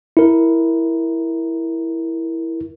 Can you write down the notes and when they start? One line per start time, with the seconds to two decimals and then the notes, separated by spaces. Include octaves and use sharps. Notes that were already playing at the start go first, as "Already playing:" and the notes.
0.17 E4 A#4